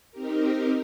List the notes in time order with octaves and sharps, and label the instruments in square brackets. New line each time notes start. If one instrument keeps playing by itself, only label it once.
[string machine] C4 D#4 G4 A#4